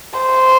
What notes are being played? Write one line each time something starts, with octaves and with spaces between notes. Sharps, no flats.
C5